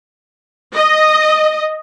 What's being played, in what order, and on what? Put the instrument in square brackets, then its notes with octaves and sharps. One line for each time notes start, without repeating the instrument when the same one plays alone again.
[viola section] D#5